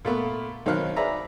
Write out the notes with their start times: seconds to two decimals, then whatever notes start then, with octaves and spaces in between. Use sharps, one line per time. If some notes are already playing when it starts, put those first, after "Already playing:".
0.05 A#2 A3 B3
0.66 B1 D#3 F#3 C4 F5 F#6
0.96 G#4 B4 D5 E5 A#5